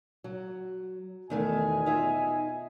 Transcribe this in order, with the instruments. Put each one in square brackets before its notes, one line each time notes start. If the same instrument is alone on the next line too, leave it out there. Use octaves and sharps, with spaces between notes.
[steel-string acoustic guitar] F#3
[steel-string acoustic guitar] E2 D#3 A3 [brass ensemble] B2 D#5 G#5
[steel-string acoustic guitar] D#4 F4 E5